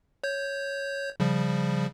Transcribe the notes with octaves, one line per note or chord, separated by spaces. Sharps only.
C#5 G6
C#3 F3 G3